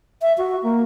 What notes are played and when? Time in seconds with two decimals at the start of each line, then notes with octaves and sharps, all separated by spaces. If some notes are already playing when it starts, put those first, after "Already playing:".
0.22 E5
0.38 F#4
0.63 A#3